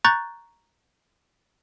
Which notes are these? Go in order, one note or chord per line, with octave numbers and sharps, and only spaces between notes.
A#5 C#6 F#6 G6 A6